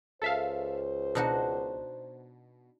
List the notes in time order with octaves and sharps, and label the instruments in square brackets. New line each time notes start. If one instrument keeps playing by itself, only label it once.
[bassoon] C#2 [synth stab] A4 E5 F5 [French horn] C5
[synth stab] B2 [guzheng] D4 D#4 F#4